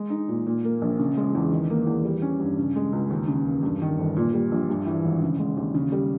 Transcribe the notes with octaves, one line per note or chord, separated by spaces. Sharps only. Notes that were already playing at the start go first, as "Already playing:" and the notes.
Already playing: G#3
D#4
A#2
A#2
A#3
A#1
C#3
G#3
E2
D#3
A#3
E2
G3
C#4
G2
C#3
G#3
C#2
D#2
C#3
E1
G2
D#3
G1
A#2
G3
A#1
G2
E3
G#1
C#3
G#3
D#2
C#3
G3